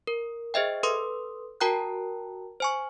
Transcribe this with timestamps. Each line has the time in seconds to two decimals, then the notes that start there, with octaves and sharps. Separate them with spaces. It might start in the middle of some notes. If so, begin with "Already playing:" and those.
0.07 A#4
0.54 G#4 C5 D#5 E5 G5
0.83 A4 B4 C6 D#6
1.61 F#4 A#4 G5 A5 A#5 F#6
2.60 C5 G#5 C#6